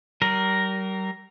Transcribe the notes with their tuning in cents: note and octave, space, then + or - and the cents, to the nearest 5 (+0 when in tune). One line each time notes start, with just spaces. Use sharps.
G3 -40 A#4 +0